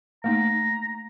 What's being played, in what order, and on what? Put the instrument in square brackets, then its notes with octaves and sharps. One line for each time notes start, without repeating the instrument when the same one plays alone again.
[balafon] A3 A#3 D#4 [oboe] A#5